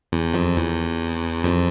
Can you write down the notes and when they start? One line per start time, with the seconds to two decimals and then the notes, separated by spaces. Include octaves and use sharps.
0.12 E2
0.34 F2
0.56 E2
1.44 F2